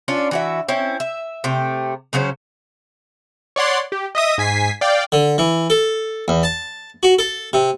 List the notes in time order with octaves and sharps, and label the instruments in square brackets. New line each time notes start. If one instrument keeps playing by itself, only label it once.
[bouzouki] C#4 D4 F4
E3 F#4 E5
C4 C#4 E4
E5
C3 A3 G5
C#3 F#3 C#4 C5
[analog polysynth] C#5 D5 F#5 C6
G4
D#5 E5 D#6 A#6
G#2 G#5 B6 C7
D5 F5 G5
[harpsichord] D3
E3
A4
E2
A5
F#4
A4
C3